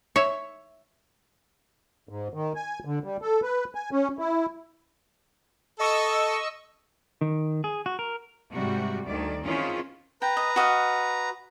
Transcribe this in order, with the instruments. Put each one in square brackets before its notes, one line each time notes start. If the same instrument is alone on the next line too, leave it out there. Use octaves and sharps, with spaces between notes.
[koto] C#5 E5
[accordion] G#2
D#3
G#5
D3
G3
A4
B4
G#5
C#4
E4
[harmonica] A4 [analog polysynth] D#5 C#6 E6
[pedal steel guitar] D#3
G#4
F#4
A#4
[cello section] G#2 C3 G3 F#4
D2 D#3 D5
D#3 C4 C#4 E4 F4 G#4
[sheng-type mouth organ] B4 A#5 [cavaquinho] G5
[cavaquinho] D#5
F#4 D#5 F5